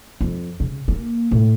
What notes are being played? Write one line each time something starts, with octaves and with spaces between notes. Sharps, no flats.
F2
C#3
A#3
A2